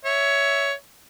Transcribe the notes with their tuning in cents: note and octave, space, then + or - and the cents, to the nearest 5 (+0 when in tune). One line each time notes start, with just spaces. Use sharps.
C#5 +15 E5 +0